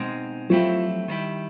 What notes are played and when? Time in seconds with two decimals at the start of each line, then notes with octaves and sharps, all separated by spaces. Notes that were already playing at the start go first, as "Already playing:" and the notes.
Already playing: B2 G#3 C4 D#4
0.50 F3 F#3 A3 C4 E4 G4
1.08 D#3 G3 C4 E4 G4